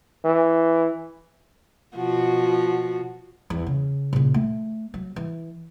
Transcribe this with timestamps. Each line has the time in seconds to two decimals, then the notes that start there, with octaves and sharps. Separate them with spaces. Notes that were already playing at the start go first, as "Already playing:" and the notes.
0.25 E3
1.96 B2 F3 F#4
3.50 E2
3.67 C#3
4.13 A#2 C#3
4.34 A3
4.94 F#3
5.16 E3